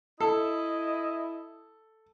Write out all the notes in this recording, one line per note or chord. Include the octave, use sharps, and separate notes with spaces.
E4 A4 D#5